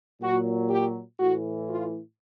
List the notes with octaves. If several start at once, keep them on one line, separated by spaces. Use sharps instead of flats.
A#2 F#3 F#4
G4
A2 E3 F#4
F4